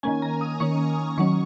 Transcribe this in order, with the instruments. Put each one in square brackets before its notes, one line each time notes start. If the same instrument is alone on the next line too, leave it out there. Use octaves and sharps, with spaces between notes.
[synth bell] D#3 A#3 C#4 G#5
A#5
D#6
D#3 A#3 C#4 C#6
D#3 F#3 C#4 C#6